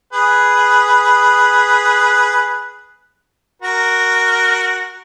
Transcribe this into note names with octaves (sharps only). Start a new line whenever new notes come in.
G#4 B4
F#4 A#4